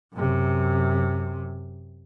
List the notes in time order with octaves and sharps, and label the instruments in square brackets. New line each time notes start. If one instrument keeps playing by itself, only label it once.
[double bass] F#2 C3